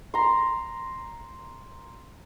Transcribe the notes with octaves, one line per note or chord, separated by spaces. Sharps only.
A#5 C6